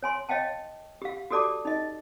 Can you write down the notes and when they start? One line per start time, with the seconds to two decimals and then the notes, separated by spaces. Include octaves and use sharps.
0.03 C#5 G#5 C6
0.29 C#5 D#5 F5 G5 A5
1.02 G4 F5
1.30 F#4 G4 A4 D5 A5 D6
1.65 D#4 D#5